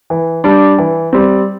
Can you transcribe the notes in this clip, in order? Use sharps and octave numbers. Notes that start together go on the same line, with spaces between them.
E3
G3 D4
E3
G3 C4